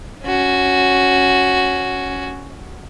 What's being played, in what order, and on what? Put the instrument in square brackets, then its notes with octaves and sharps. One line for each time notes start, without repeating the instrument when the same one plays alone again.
[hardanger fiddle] C#4 F#4